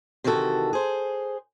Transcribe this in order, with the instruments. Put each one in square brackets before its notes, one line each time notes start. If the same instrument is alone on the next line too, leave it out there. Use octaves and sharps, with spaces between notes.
[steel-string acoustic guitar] C3 D#3 E3 F#4 A4
G#4 C5